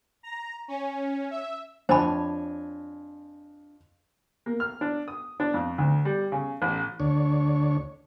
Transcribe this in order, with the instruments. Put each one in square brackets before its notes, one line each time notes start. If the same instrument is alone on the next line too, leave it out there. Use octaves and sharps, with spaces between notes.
[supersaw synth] A#5
C#4
E5
[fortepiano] F2 G5 G#5 [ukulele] D4 C#5 [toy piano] C5 B5
[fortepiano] A#3
F6
D4
D#6
D4
F2
D2
G3
C#3
A1
[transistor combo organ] D2 D4 C#5